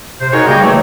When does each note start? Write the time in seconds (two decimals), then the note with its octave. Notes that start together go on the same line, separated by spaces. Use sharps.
0.20 C3 C5
0.33 D#4 F#4 G#4 A#4 C#5
0.48 C#3 G3 A#3 G4 D#5 G5
0.61 E3 F#3 A3